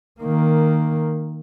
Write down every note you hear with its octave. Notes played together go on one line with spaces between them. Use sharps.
D#3 A#3